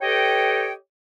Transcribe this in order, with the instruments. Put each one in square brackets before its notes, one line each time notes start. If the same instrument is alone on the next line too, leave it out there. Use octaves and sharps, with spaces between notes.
[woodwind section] G4 A4 B4 C#5 D#5 G5